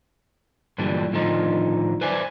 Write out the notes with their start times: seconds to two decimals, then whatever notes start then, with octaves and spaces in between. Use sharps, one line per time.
0.78 G2 A#2 D3 E3 F#3 G3
1.13 A2 D3 D#3 F3 D#4
2.01 B4 C5 D5 E5 G#5